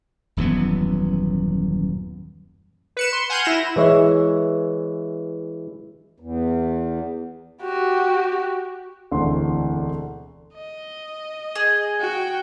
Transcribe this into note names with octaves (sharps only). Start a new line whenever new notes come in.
D#1 F#2 E3 B3
B4 C#7 E7
C6
F#5 G#5 F6 G6 C7 D#7
E4 A#6 E7
E3 G#3 C#5 E5
E2
F#4 G4
E1 D2 E3 C4 C6
D#5
G#4
F#4 G5